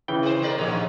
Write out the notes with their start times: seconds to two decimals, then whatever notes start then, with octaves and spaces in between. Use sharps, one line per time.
0.08 C#3 E3 G5
0.23 C4 C5
0.42 G#3 A#4 D5
0.58 A#1 D#2 G#2 C#5